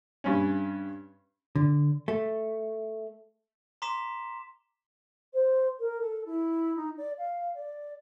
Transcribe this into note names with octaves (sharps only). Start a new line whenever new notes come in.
G2 C#4
D3
A3
A#5 C6 D6 B6 E7
C5
A#4
A4
E4
D#4
D5
F5
D5